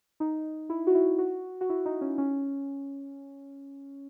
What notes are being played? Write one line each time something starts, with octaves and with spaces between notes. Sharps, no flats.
D#4
E4
F#4
E4
F#4
F#4
E4
D#4
C#4
C#4